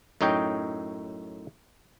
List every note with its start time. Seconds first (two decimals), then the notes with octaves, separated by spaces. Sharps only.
0.21 F#2 A2 D#4 C#5 D#5 G5